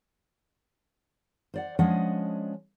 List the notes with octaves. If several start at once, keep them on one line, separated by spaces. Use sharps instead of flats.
C5 D5 F#5
F3 G#3 C#4 D4 D#5 F#5